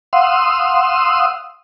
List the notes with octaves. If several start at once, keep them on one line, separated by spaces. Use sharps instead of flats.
F5 F#5 C6 D#6 E6